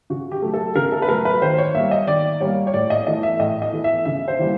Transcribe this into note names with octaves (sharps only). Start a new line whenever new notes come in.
C#3 F#4
G4
F#3 A3
A4
C#3 A#4
A4
B4
F#3 A3 A#4
B4
D#3 C5
C#5
G3 A#3 E5
D#5
D#3 D5
G3 A#3 C#5
C#5
A2 D5
D#5
E3 A3 D#5
E5
A2 D#5
D#5
E3 A3
E5
C#3 E5
C5
E3 G3 A#3